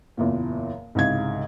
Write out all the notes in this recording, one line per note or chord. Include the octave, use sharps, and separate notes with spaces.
F#1 E2 A#2
C2 G#2 C#3 G#6